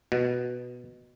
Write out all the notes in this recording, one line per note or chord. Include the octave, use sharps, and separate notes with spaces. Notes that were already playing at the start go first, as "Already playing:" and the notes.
B2